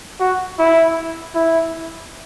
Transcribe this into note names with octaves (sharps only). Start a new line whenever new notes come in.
F#4
E4
E4